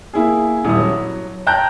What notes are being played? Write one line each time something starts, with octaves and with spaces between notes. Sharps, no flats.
A#3 E4 G#4
D#1 E4 D#6
F#3
G5 A5 A#5 F#6 G6